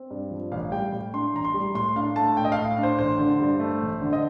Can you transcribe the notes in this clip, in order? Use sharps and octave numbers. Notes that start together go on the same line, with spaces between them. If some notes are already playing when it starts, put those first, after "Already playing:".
Already playing: C4
G2
F3
A1 F5
G3 G5
A2
D4 C6
A1 A#5
C6
G3
A2 C6
D4 F5
A3 A5
A2 G5
D#5
F5
A2
D4 C5
A1 C5
D3
G2
A3
A1
D3
D#5